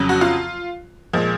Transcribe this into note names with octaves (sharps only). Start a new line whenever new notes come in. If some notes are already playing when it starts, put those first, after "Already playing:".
Already playing: F2 C#3 F#3
F#4
F4
A#2 F3 G#3